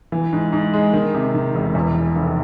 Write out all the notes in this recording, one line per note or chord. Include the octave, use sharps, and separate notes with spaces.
E3
G#2
G#2
G#3
D#3
C3
D#3
E1
E2
E3
F1